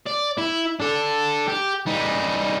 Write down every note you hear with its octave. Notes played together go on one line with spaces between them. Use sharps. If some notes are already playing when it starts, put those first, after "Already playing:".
D5
E4
D4 A4
G4
G3 D#4